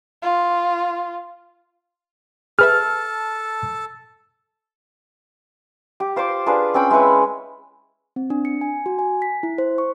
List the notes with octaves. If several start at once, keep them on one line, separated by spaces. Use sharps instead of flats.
F4
G#4 A4 B4 E5 A5 F6
G4
F4 C5 C6 D6
D4 F4 G#4 B4
C4 C#4 G5 B5
G#3 E4 B4 C#5
C4
D4
C#7
G#5
F#4
G#5
B6
E4
C5
C#6